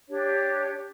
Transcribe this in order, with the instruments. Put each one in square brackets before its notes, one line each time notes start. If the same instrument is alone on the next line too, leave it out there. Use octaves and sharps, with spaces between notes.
[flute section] D4 G4 C#5